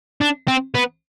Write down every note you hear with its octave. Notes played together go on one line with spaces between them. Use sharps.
D4
C4
B3